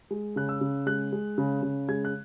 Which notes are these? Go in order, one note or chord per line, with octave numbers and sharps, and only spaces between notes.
G#3
C#3 F#6
E6
C#3
G#3 F#6
G#3
C#3
C#3
G#3 G#6
F#6